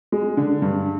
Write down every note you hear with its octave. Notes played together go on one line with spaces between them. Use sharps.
G#3
D3
G2